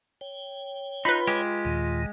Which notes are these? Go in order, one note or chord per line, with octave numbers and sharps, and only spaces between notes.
C#5 G5
D#4 F4 B4 B5
G#3 G4
D#2 A#2 D#3